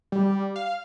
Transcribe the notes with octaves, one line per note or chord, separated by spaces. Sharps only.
G3
F5